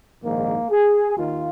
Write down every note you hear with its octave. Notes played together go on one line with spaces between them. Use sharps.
A#1 G#2 D#3 A#3
G#4
D#2 D#3 F4